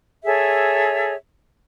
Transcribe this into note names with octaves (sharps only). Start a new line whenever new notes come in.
G#4 A4 C#5 E5